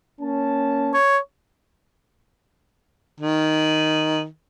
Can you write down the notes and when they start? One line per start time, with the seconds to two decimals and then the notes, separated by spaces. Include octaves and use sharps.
0.21 A#3 C#4 A5
0.94 C#5
3.20 D#3